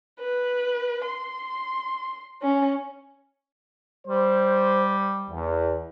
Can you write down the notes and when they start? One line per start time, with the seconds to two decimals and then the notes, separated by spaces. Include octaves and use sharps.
0.19 B4
1.05 C6
2.41 C#4
4.08 G3 C5
5.30 E2